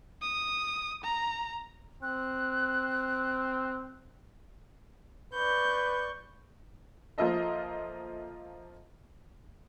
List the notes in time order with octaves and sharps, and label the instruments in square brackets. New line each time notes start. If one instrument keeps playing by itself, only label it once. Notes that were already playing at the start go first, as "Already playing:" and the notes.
[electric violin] D#6
A#5
[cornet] C4 [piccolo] F#6
[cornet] B4 [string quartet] D5 C#6 G6
[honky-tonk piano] F3 A#3 F4 A4 D#5 E5